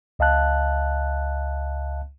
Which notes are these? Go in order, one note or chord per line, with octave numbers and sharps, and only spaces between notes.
C#2 D#5 F5 A5 F#6